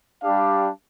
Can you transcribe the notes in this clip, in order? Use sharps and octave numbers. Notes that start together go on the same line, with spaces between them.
G3 D4 G4 F5